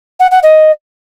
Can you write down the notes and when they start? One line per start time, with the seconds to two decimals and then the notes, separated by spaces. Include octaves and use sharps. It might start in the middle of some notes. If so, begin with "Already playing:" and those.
0.20 F#5
0.31 F#5
0.43 D#5